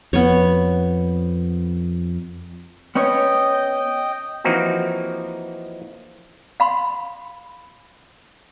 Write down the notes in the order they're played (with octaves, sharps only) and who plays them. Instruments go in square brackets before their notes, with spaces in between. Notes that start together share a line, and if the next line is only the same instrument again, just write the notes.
[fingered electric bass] F2 [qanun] B3 C#5
[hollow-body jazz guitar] B3 C#4 C#5 [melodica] D#5 G5
[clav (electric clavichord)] E3 F3 A#3 C4 D#4 F#4
[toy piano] F5 B5 C6